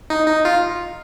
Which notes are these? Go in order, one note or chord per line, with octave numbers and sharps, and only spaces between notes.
D#4
D#4
F4